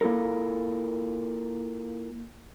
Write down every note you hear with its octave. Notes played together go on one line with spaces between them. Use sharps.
A#3 E4 F4 A4 A#4